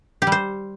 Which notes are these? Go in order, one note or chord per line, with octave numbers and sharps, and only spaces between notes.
G4
G3
C5